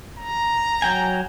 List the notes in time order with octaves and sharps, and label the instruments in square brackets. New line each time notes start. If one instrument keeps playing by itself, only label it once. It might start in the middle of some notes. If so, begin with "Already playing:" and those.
[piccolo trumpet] A#5
[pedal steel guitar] F#3 G5 G#5